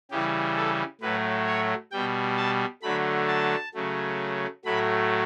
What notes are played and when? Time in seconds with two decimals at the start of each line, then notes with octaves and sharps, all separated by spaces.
0.11 C#3 E3 G3 G4
0.57 A4
1.01 A2 F#3 A3 B4
1.47 C#5
1.92 B2 G3 G5
2.37 A5
2.82 D3 F#3 A3 B5
3.28 A5
3.74 C#3 F#3 A3
4.65 A2 F#3 A3 B5